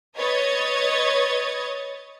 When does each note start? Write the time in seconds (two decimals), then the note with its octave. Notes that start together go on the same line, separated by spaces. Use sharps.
0.17 B4 C#5 D#5 D#6 G#6 A6